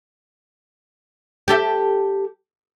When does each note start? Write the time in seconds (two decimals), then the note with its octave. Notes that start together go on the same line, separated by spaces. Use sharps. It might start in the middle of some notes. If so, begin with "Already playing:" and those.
1.48 G4 A4 E5